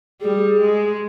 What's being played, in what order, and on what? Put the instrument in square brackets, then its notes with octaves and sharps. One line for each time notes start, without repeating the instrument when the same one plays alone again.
[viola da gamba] G3 [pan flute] G#4
[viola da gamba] G#3